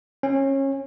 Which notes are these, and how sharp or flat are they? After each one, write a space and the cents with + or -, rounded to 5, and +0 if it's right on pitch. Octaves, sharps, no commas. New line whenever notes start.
C#4 -25